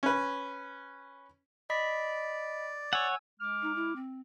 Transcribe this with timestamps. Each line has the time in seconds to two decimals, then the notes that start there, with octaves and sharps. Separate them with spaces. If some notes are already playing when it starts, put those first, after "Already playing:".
0.03 C#4 B4
1.70 D5 D#5 B5 B6
2.93 C#5 F#5 G#5 E6 G#6
3.40 G#3 D6 F6
3.62 D#4
3.75 E4
3.96 C4